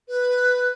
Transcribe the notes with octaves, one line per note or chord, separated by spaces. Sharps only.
B4